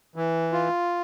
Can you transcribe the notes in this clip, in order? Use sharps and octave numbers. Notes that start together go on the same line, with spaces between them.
E3
F4